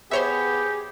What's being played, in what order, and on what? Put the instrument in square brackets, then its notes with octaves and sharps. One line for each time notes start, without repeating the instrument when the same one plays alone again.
[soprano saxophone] B3 [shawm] G4 [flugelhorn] G#4 [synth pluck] C5 C#5 E5